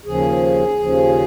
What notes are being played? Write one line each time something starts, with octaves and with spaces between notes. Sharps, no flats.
D#2 C#3 F3 G#4
D#2 C#3 F3